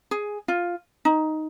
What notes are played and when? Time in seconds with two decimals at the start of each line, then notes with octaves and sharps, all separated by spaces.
0.11 G#4
0.48 F4
1.05 D#4